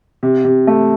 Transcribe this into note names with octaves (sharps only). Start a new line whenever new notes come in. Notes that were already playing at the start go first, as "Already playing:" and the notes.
C3
C3
A3